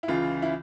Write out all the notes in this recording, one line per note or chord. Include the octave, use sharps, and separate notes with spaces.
E4
C#2 C#3 E3 F4
E4